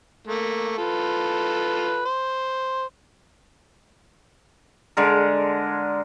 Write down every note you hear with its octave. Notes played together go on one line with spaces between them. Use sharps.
A3 A#3
F4 A4 B4
C5
D3 G#3 A#4